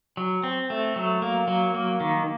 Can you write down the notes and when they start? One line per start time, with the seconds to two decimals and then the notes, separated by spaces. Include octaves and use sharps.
0.17 F#3
0.44 C4
0.70 A3
0.96 F#3
1.22 A#3
1.48 F#3
1.75 A#3
2.00 D#3